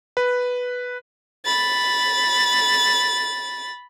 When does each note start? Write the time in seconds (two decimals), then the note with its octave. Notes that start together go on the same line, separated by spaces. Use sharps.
0.17 B4
1.45 B5 A6